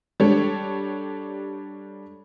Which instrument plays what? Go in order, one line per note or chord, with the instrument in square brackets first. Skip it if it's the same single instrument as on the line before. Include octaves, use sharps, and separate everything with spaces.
[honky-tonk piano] G3 D4 G4 A4 C#5